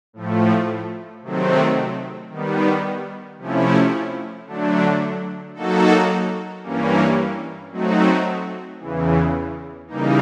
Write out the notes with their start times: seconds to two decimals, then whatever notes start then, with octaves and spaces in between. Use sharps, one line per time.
0.13 A2 F3 A3
1.22 C3 D#3 F#3 A3 C4
2.30 D#3 G3 B3
3.38 C3 F3 A3 C#4 E4
4.46 D3 F#3 A3 D4
5.55 F#3 A#3 D#4 F#4 A4
6.63 G2 E3 G3 A#3 C#4
7.71 F#3 A3 C4 D#4 F#4
8.79 E2 C#3 E3
9.87 C#3 E3 G3 A#3 D#4